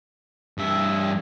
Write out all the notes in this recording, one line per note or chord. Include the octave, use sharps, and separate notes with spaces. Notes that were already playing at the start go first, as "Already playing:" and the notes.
G2 E5